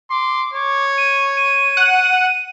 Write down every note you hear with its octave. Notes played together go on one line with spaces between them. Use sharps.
C6 D6
C#5 D6
D#7
D#7
F#5